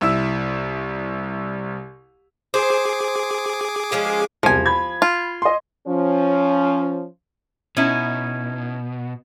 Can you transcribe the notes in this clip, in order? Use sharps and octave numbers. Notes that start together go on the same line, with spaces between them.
C2 E4 E6
G#4 C5 D6
F3 G#3 C#4
E1 C2 F3 G#5
B5 G#6
F4
D#5 C6
F3 C#4
B2 C#4 D#4 E4